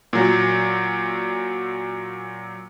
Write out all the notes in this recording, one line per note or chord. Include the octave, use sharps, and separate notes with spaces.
A#2 F#3